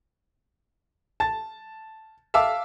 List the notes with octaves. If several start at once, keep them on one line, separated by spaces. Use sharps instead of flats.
A5 A6
E5 F5 A5 D6 E6